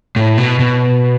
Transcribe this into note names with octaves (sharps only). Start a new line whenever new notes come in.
A2
B2
B2